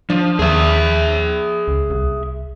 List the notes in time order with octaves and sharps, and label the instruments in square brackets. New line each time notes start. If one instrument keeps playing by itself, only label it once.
[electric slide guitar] F3 [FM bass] D4
[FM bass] D#2 [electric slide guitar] G#4 E5
[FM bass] C#2
C2